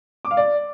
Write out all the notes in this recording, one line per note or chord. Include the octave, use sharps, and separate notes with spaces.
D6
F5
D5